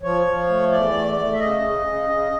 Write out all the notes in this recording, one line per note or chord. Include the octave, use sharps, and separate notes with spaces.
F3 C#5
F3
A3
E2 D5
A3
A3
E5
C#3 D#5
C#3
C#3
C#3